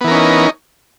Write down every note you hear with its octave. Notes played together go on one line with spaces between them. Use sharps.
E3 B3 C#4 D#4 A#4